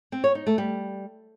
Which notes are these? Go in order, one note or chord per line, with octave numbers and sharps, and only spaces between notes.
C4
C#5
D#4
A3
G3